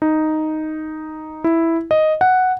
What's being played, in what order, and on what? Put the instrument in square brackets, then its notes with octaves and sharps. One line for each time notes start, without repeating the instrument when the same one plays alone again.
[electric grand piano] D#4
E4
D#5
F#5